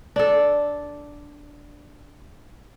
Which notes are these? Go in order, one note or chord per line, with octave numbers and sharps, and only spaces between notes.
D4 A4